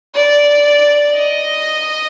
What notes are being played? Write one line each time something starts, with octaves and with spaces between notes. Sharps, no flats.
D5
D#5